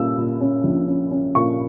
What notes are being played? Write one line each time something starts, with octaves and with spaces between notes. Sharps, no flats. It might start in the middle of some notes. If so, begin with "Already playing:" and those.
Already playing: A#2 G3 C#4 E6
A#2
C#4
A#1
C#4
C#4
A#2 C#6